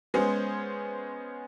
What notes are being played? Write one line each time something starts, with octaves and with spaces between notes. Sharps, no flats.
G#3 B3 C#4 G#4 C5